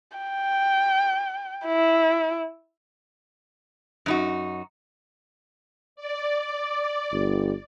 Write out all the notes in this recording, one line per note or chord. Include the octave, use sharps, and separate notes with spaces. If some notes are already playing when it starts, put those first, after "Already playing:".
G5
E4
F#2 D#4 F#4
D5
G1